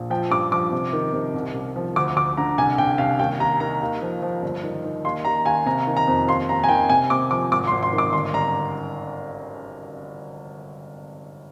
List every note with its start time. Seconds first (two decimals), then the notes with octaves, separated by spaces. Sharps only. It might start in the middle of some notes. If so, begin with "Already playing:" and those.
Already playing: A#1
0.10 F3 G5
0.31 G2 D6
0.52 F3 D6
0.72 C3
0.93 D#3
1.13 C3
1.34 C2
1.54 C2
1.76 F3
1.96 D2 D6
2.16 D2 D6
2.37 D3 A#5
2.58 C2 G#5
2.78 C2 G5
2.98 C2 F5
3.19 D#2 G5
3.40 D#2 A#5
3.60 D#3 A#5
3.82 D#2
4.02 F3
4.22 F3
4.42 G1
4.63 D#3
4.84 D#3
5.05 D#2 C6
5.25 D#2 A#5
5.45 D#2 G#5
5.66 C3 A#5
5.87 D#3
5.97 A#5
6.08 F2
6.27 D#2 C6
6.49 D#2 A#5
6.64 G#5
6.69 D#3 G5
6.89 C3 G#5
7.10 C3 D6
7.31 F3 D6
7.52 G#1 D6
7.67 C6
7.72 G#1
7.83 C6
7.93 D#3
7.98 D6
8.13 G1 C6
8.34 G1 A#5